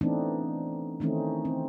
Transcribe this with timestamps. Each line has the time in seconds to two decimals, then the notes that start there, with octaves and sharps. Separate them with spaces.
0.01 E3 A3 B3 C4 D4 D#4
1.00 D#3 E3 A3 C4 C#4 D#4
1.45 C4